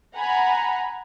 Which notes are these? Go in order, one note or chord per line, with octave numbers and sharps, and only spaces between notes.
F#5 G#5 A#5 B5